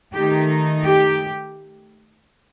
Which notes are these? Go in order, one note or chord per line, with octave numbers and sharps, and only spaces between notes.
D#3 A3 D#4 G4
G4